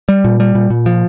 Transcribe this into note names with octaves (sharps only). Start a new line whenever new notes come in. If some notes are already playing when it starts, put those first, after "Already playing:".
G3
A#2
G3
A#2
A#2
F3